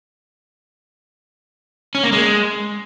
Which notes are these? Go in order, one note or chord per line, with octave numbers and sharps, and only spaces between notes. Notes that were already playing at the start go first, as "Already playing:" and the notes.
C#4
A#3
G#3